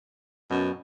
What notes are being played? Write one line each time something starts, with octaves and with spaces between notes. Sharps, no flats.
F#2 B2